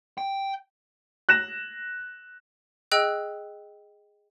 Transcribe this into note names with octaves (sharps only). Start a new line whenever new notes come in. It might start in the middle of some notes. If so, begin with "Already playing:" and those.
G5
F#6 A#6 E7
G#4 D#5 G5 E6 F#6